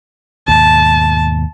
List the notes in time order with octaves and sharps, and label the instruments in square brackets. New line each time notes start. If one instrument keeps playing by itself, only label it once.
[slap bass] D#2 G#2 B2 [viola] A5